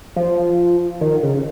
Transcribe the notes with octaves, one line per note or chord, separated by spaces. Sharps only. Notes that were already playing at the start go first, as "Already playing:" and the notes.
F3
D#3
C#3